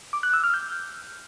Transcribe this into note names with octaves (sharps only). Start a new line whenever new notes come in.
D6
F#6
E6
F6
G6